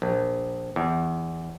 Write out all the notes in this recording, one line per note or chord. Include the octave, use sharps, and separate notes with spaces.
A#1
E2